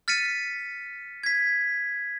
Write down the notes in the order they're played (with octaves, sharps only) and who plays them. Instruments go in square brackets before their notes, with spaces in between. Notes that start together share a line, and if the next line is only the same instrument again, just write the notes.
[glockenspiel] F6 A6 B6 C#7 D#7
G#6 B6